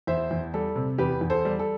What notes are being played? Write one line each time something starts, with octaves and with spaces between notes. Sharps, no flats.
E2 C5 E5
E2
G3 A4
C3
E2 G4 B4
E2
A4 C5
G3
A4